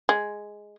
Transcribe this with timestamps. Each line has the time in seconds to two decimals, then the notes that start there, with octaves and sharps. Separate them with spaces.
0.09 G#3